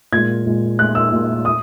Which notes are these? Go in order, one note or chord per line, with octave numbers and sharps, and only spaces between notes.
A#2 G#3 G#6
A#2 G#3
A#2 G#3 F#6
E6
A#2 G#3
D#6